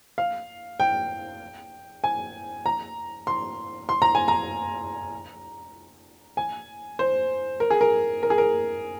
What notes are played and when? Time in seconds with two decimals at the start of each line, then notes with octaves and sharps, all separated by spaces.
0.18 F5
0.80 G5
2.04 G#5
2.66 A#5
3.27 C6
3.89 C6
4.02 A#5
4.15 G#5
4.28 A#5
6.37 G#5
6.99 C5
7.60 A#4
7.70 G#4
7.81 A#4
8.23 A#4
8.30 G#4
8.38 A#4